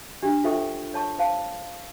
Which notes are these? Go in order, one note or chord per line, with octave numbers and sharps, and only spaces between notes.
D4 G4
F4 A4 C5 E5 G5 C#6
C#5 A5 C#6
C5 F5 A5